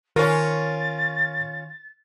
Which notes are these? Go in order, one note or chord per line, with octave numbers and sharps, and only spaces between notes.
D#3 C#4 F4 A#4 A6